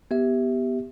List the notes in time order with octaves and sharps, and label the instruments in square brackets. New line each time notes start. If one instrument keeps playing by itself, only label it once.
[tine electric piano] B3 G4 E5